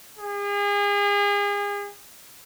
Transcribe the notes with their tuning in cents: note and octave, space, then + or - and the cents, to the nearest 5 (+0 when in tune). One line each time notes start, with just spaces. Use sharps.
G#4 -35